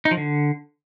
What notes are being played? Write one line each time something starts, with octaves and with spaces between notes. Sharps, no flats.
D#4
F3
D3